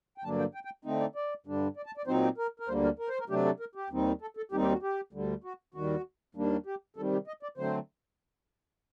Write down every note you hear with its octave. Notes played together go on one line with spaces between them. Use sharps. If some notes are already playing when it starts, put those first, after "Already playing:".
G5
G2 D3 F#3 A#3 D4 A5
G5
G5
G5
D3 A3 C4 D#4
D5
D5
G2 D3 G3 D4
D5
A5
D5
A#2 F#3 C4 D#4 C5
G4
A#4
A#4
D2 D3 G3 A#3 C5
A#4
A#4
C5
A#4
C3 F#3 A3 D4 G4
A4
A#4
G4
D#2 D#3 G3 C4 D#4
A4
A4
D#2 D#3 G3 C4 D#4 G4
G4
F#4
G4
D2 D3 G3
F#4
D#2 D#3 G3 F#4
D#2 D#3 G3 A#3 D4
G4
C3 D#3 G3 A4
G4
D#5
D5
D3 F#3 A3 C4 C5